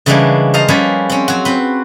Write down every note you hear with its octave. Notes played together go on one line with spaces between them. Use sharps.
C#3 E3 G3 G#3 A#3 D4
C5 D#5 F5 A5 A#5
F3 G3 A#3 C#4 G#4 B4
C4 C#4
F#3 F#4
C4 B4